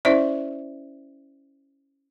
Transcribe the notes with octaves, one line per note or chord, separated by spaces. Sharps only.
C#4 E4 C5 D5 E5